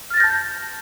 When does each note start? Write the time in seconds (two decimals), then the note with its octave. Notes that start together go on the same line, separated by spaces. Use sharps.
0.10 F6
0.14 A6
0.17 A#6
0.20 G6
0.24 A5